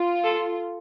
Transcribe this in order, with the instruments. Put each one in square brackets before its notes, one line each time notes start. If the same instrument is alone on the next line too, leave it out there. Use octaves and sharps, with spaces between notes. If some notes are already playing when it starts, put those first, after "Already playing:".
Already playing: [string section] F4
[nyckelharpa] A4